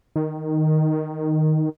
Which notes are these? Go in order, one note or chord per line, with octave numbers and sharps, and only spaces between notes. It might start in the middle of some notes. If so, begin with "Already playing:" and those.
D#3